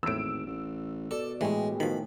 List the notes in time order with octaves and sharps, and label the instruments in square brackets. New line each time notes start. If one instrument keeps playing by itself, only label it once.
[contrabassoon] G#1 [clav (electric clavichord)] E2 A2 [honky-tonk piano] E6 D7
[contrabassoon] A1
[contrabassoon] B2 [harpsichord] A4 [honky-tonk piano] D5
[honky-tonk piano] A2 G4 G#4 [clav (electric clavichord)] E3 A3 [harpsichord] G#3
[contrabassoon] B2 [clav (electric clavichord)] D#3 F3 [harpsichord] B5